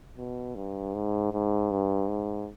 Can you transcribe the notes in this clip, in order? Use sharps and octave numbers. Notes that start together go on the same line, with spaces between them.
B2
G2
G#2
G#2
G2
G#2